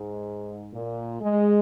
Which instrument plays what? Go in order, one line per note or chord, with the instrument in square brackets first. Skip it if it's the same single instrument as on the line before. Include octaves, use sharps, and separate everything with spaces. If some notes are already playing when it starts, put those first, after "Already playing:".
Already playing: [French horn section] G#2
A#2
G#3